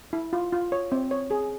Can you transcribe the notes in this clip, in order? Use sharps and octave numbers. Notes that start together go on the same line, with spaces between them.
E4
F4
F4
C#5
C4
C#5
G#4